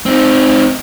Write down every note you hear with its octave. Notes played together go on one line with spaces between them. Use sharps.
C4 D#4